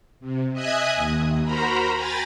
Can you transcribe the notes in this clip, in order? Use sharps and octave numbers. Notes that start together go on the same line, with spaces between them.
C3
D#5 E5 G#5 D#6 F#6 G#6
D#2
F#4 A#4 C5 A#5 B5
G5 G#5 A#5 B5 A6